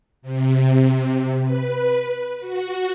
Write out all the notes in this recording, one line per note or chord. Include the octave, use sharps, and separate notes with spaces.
C3
B4
F#4